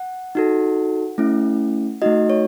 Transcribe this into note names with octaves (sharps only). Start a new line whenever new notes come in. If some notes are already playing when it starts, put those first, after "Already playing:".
Already playing: F#5
D#4 F#4 A4
A3 C#4 E4
A3 D#4 F#4 D#5
C#5